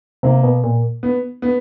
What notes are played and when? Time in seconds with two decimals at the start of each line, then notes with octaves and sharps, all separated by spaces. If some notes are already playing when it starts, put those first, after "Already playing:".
0.23 C3 A#3
0.43 B2
0.64 A#2
1.03 B3
1.42 B3